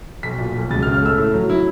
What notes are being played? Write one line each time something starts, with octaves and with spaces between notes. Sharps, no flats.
B1 B6
A#2
B1
C#2 A6
F6
C#3
F6
A3 E6
A2
F#3
E4